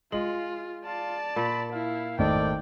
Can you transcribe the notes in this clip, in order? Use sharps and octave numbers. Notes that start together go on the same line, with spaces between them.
G#3 F4 F#7
F4 D5 A5
A#2 B5
E4 F5
G#1 A3 D5 D#5 G5